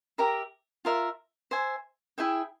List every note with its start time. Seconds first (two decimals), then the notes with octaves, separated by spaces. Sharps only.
0.18 G4 A#4 E5 A#5
0.85 F4 A#4 E5
1.51 C5 E5 G#5
2.18 E4 G#4 E5 G5